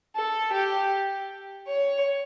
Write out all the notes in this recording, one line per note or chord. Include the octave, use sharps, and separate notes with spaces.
A4
G4
C#5